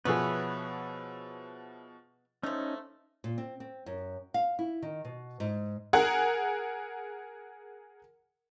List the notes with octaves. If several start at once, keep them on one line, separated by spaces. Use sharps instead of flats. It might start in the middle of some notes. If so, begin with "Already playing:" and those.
B2 F3 B3 G#4 B4 C#5 E5
F3 A3 C#4 D#4
A#2
C4
C4
F#2
F5
E4
D#3
B2
G#2
G#4 A#4 F#5